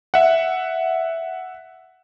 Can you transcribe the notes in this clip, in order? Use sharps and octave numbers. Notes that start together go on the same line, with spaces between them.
E5 F#5